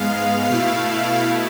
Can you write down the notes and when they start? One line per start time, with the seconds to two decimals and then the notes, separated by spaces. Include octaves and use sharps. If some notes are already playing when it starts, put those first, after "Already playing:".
Already playing: G#2 G#3 B3 F5
0.50 B2 A3 E4